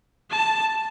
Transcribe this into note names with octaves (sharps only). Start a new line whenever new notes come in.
A5